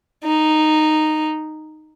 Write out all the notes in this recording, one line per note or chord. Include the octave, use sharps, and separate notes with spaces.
D#4